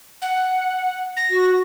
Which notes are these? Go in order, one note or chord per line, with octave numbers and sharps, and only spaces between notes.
F#5
A#6
F#4